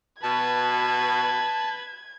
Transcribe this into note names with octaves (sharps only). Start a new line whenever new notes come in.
B2 B4 A5 G#6